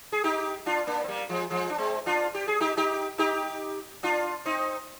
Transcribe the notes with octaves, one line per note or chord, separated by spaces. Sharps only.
G#4
D#4 G4
D4 F4
A#3 D4
C4
G3 A#3
F3 G#3
F3 G#3
D4
G#3 C4
D4 F4
G4
G#4
D#4 G4
D#4 G4
D#4 G4
D4 F4
C4 D#4